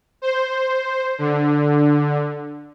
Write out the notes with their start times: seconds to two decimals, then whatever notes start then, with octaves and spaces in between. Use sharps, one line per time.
0.22 C5
1.19 D3